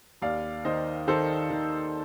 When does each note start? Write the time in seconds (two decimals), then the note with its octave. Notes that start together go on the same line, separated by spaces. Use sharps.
0.22 D#2 D5 F5
0.65 D#3 C5 D#5
1.08 D#3 A4 C5
1.50 D#3